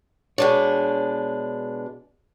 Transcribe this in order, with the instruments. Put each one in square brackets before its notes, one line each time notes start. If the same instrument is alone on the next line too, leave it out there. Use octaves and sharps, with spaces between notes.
[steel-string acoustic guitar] B2 G#3 D4 [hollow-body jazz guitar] C#5